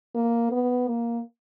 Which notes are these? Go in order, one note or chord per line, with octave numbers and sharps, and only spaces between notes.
A#3
B3
A#3